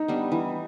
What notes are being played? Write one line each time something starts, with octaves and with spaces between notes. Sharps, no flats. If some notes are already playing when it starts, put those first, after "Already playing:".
Already playing: A3 D#4
G3 B3 D4
E3